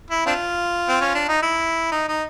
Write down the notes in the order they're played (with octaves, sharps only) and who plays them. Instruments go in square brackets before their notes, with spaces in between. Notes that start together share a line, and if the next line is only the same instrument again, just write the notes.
[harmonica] E4
C4 D4 F4
C4
C#4
D4
D#4
E4
D#4
D#4